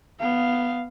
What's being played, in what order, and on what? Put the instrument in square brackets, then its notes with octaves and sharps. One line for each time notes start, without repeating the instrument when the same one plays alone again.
[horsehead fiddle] B3 F5